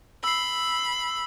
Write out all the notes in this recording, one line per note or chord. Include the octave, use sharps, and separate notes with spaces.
B5 E6 C7